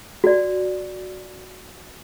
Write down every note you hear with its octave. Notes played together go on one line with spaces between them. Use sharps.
F#4 D5